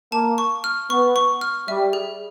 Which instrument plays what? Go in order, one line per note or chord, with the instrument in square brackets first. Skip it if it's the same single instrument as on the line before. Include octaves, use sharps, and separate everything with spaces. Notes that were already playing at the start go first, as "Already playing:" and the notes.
[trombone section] A#3 [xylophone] A5
[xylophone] C#6
F6
[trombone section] B3 [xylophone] C#6
[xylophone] C#6
F6
[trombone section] G3 [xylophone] E5
[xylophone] G#4